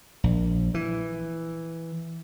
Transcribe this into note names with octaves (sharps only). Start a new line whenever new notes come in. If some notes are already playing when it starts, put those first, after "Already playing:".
A#1
E3